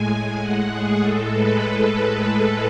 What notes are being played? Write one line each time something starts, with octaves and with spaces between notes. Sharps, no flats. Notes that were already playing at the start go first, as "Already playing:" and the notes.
Already playing: A2 G#3 G#5
A2 G#3 F#5
G#4
A2 G#3 A4
B4